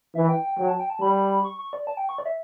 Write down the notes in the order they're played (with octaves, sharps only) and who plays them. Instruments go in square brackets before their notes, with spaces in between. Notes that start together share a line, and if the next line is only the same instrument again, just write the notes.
[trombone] E3 [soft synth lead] E5
[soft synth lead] G5
G5
[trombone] F#3 [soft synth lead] G5
[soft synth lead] A5
G5
A5
[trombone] G3 [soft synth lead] B5
[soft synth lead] C#6
C#6
D5
A5
G5
C#6
D5
E5